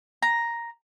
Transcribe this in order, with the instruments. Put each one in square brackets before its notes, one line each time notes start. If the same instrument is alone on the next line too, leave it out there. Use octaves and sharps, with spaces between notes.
[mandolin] A#5